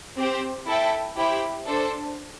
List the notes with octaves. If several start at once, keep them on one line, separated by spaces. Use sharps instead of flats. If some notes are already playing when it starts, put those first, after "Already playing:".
C4 G4 C5
E4 A4 E5 G5
E4 G4 C5 G5
D4 A4 C5